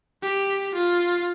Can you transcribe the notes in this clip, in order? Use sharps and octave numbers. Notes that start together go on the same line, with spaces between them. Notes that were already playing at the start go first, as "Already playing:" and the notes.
G4
F4